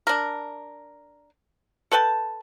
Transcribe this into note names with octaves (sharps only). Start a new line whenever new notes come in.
D4 A#4
A4 B4 G5 A5